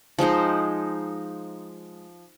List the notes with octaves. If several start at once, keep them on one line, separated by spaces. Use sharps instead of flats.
F3 G#3 D#4 C5